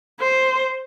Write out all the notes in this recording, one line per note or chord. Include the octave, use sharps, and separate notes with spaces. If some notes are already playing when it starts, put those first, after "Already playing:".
C5